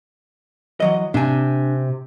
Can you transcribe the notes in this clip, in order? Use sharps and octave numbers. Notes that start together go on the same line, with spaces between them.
E3 F#3 D#5
C3 D4 G#5